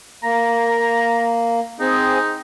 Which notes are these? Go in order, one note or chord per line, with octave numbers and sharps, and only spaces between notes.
A#3 A#5
C4 D#4 G#4